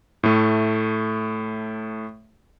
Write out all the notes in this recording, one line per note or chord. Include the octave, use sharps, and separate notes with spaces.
A2 A3